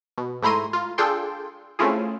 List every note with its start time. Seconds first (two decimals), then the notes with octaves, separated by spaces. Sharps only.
0.18 B2
0.42 G#2 A3 E4 A#5 C6 D#7
0.73 F4
0.98 D4 F4 G#4 A4 G5 C6
1.79 A3 C4 C#4 E4 F4 G#4